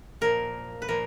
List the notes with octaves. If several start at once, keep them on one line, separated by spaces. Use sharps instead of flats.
A#2 F3 A#3 A#4
B4
A#2 F3 A#3 A#4